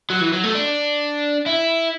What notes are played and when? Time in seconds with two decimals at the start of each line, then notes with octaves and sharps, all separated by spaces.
0.10 F#3
0.21 E3
0.33 F#3
0.44 A3
0.54 D4
1.46 E4